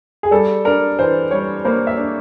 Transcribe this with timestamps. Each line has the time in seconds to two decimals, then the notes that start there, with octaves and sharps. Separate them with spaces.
0.23 G#4
0.31 G3 A4
0.65 D4 A#4
0.99 E3 C5
1.31 G3 C#5
1.65 A#3 C5
1.87 E5
1.98 D4